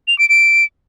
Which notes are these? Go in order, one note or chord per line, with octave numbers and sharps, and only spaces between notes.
F7
D7
D7